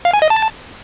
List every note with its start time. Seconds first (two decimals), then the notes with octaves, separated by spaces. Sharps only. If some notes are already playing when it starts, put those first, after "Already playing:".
0.05 F5
0.13 G#5
0.22 D#5
0.30 A5